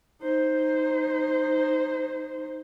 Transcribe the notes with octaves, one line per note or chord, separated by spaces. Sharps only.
D#4 C5